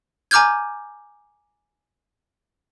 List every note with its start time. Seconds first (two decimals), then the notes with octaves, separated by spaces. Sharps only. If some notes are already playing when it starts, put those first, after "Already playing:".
0.31 G#5 A#5 D6 F6 G6 G#6